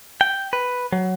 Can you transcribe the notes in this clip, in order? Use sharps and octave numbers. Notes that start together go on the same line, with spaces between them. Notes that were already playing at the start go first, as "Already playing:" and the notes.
G5
B4
F#3